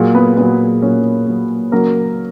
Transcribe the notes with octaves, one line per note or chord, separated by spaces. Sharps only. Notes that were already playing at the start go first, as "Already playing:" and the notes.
Already playing: A#2 F#3 G#4
B3 B4
A#2 F#3 B3 B4
A#2 F#3 C#4 C#5
A#2 F#3
C#3 F#3 A#3 A#4